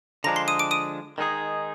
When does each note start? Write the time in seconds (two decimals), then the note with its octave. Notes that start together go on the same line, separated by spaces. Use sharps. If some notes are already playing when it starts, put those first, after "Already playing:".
0.24 D3 F3 G#3 D4 A#5 A#6
0.36 C6 C7
0.48 D#6 D#7
0.59 D6 D7
0.71 D#6 D#7
1.18 D#3 G#3 D#4 G#4